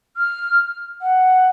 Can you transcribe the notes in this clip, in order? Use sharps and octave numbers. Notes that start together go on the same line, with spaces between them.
F6
F#5